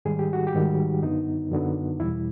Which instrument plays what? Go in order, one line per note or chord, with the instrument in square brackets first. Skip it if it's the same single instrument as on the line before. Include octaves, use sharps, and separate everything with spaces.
[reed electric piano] G#2 D#3 G3 G#4
G4
F#4
G4
G#2 D#3 G3
F#2 D3 F#3 B3 D#4
F#2 D3 F#3 B3
E2 B2 G3 E4